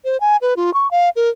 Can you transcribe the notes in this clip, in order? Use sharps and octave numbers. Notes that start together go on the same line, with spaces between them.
C5
G#5
B4
F4
C#6
F5
A#4